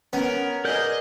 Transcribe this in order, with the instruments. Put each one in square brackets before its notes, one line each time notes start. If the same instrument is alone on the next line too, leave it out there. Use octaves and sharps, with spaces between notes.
[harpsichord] B3 [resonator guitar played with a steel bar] C#4 [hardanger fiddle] A#4
[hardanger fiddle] G#4 D#5 [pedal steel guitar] A#4 D5 G6